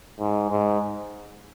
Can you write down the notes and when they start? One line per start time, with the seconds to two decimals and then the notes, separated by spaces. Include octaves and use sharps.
0.19 G#2
0.51 G#2